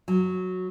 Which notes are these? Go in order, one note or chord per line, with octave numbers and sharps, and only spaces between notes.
F#3